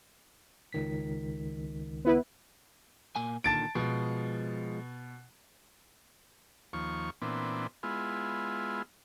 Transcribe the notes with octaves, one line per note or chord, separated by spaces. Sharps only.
C#2 D#3 B6
B3 E4 B4
A#2 A#3 G#5
A#2 D3 D#3 A5 A6 D7
B2 F3 G#3
D#2 F3 C#6
A#2 E3 B3 C4 D4
G#3 B3 E4 F4